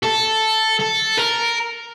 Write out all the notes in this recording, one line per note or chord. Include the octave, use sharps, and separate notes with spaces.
A4
A4
A#4